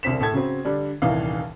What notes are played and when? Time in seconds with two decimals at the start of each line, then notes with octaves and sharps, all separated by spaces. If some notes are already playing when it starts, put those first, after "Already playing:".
0.03 E1 C2 D3 C4 B6 E7
0.20 A2 A4 G#6
0.34 C#3 F#3 C4
0.65 D3 G3 D4
1.02 D#1 C2 D#3 E3 F5